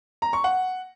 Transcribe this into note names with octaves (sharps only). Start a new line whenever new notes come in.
A#5
C#6
F#5